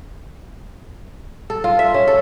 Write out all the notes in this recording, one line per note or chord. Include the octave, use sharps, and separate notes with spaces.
A4
F4
E5
C#4
A4